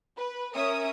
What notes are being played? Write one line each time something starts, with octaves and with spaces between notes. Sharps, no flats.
B4
C#4 A#4 E5 D#6